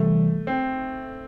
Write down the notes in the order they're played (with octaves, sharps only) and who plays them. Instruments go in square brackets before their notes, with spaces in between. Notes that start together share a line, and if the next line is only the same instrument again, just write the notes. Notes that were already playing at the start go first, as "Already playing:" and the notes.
Already playing: [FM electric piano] C3 E3 G3 [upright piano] A3
[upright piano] C4